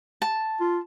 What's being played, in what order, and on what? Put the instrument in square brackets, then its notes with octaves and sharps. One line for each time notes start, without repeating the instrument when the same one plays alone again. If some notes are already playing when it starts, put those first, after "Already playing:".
[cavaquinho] A5
[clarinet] F4